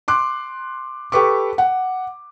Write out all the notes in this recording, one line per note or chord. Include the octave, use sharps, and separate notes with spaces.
C6 D6 F#6
G4 A4 B4 C#6 D6
F#5